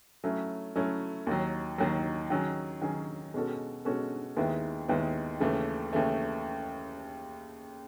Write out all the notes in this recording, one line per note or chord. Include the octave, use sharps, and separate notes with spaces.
F#3 A3 C#4 E4
F#3 A3 C#4 E4
D#2 D#3 F#3
D#2 D#3 F#3
D#3 F#3 C#4 G#4
D#3 F#3 C#4 G#4
B2 G#3 C#4 F#4 A4
B2 G#3 C#4 F#4 A4
D#2 D#3 G#3 B3 E4
D#2 D#3 G#3 B3 E4
D#2 C#3 E3 A3
D#2 C#3 E3 A3